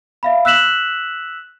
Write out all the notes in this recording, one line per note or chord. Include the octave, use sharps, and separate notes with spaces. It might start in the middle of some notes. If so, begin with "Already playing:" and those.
E5 F5 B5
E6 F#6 B6 E7 F#7